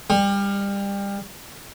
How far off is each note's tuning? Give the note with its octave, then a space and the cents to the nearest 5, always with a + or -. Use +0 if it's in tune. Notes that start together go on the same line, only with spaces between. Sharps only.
G3 +30